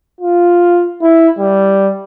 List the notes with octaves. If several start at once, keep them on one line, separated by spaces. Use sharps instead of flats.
F4
E4
G3